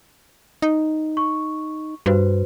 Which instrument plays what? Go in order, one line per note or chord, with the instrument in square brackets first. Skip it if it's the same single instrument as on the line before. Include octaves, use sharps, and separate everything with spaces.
[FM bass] D#4
[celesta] C#6
[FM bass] G2 [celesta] F#4 B4 C5